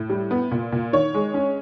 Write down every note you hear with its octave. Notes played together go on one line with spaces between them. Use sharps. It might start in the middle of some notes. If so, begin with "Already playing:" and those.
Already playing: A2
G3
B3
A#2
A#2
D#3 C#5
G#3
C#4